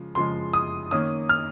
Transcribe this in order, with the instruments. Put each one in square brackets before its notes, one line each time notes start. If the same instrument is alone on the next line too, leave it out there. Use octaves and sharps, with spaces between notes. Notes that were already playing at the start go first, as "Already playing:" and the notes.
Already playing: [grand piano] C#3 F3 G#3
C#3 F3 G#3 C6
D#6
D#3 A#3 C#4 D#6
F6